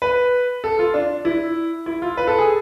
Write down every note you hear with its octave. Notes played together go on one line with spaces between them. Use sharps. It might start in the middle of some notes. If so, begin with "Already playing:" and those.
B4
A4
F4
D4
E4
E4
F4
B4
A4
G#4